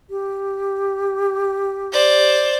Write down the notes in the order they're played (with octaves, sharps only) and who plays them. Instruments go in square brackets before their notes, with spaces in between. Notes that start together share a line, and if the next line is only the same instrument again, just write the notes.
[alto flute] G4
[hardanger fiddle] C5 D5